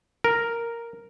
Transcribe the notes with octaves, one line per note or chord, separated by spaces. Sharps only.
A#4